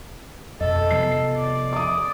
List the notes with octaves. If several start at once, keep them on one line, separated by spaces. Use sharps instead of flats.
F2 B2 A4 D#5
C3 F3 B3 C7
D5
D6 D#6